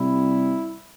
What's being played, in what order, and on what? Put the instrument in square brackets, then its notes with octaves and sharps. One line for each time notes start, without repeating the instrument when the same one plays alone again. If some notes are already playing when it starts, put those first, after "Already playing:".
Already playing: [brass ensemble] C3 G3 E4